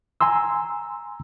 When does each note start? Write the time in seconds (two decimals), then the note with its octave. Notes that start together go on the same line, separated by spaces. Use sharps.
0.21 G#5 A#5 C6 E6